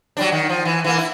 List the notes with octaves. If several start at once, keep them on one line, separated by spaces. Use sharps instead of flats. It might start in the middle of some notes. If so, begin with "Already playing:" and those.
F#3 G3 D4
D#3
F3
E3
E3 A#3
E4